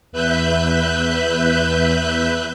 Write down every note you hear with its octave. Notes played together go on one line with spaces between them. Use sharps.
E2 B4 E5 F#6 G6